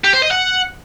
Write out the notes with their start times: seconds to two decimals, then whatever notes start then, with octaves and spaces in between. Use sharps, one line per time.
0.04 G4
0.13 C5
0.22 D#5
0.31 F#5